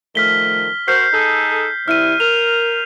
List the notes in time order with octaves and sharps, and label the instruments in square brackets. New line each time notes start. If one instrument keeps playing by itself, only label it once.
[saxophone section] D#3 F3 A3 [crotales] F6 B6 G7
[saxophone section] F#4 A#4 C5 [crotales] G6 C7
[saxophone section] D#4 G#4 A4
[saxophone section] C3 G3 E4 [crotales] F6 D#7
[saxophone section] A#4 [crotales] F7